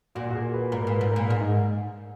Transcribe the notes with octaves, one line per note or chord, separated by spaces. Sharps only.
A#2 F#4
F#4
G#4
B4
G#2 A#4
A#2 B4
G#2
A#4
A#2
G#2 G#4
D#4